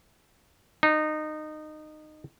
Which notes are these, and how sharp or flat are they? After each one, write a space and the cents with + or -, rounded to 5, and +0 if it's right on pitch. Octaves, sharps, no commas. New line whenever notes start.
D#4 -20